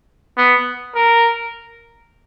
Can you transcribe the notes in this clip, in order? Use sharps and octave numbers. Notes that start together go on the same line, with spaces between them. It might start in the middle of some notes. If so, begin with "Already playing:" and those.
B3
A#4